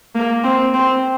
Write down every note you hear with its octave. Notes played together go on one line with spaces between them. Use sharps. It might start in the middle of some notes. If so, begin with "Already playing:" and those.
A#3
C4
C4